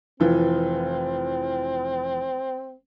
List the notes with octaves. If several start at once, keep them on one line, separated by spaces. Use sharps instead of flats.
F1 E3 F3 C4